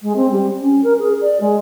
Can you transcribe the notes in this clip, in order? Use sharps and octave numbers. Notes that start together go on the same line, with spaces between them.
G#3
C4
G3
C#4
A#4
G#4
D5
G#3